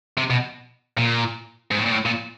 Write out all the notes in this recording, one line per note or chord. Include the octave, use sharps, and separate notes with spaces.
C3
B2
A#2
G#2
A2
A#2
A2
A#2